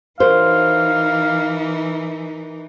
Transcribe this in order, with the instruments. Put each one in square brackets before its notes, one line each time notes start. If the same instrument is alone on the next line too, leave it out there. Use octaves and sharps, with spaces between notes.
[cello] E3 D#4 [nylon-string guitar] F#4 C5 C#5 [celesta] A#4 [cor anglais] F5